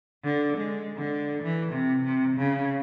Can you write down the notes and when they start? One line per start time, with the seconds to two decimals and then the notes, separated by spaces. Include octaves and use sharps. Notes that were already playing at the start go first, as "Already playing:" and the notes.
0.24 D3
0.57 G#3
0.97 D3
1.43 E3
1.72 C3
2.05 C3
2.37 C#3